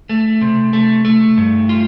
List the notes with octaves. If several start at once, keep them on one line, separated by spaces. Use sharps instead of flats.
A3
C3
A3
A3
G2
F4